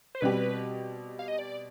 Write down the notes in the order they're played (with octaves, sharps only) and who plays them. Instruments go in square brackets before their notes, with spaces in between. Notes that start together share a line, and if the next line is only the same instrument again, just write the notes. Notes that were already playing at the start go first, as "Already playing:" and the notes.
[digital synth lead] C5
[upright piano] B2 G3 C4 G4 [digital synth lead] B4
[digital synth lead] F5
D#5
D5